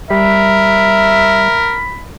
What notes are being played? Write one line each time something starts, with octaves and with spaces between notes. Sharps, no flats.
G3 A#4 E5 B5